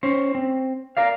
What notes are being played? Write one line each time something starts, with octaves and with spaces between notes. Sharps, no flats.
C#4 C5
C4
A#4 D5 F5